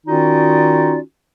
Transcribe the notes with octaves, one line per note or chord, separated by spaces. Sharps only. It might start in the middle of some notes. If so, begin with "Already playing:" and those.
D#3 C#4 D#4 F4 F#4 D5